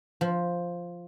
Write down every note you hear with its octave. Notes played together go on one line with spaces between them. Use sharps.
F3